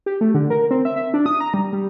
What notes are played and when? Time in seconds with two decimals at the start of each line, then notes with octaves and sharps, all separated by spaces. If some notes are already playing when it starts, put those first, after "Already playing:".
0.06 G4
0.21 A3
0.34 D3
0.50 A#4
0.71 C4
0.85 E5
0.96 E5
1.14 D4
1.26 D#6
1.40 A#5
1.54 G3
1.73 G3